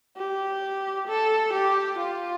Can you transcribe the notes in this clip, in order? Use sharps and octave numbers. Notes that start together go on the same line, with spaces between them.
G4
A4
G4
F4